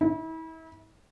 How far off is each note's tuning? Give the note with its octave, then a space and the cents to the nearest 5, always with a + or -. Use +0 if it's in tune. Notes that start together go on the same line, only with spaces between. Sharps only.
E4 -35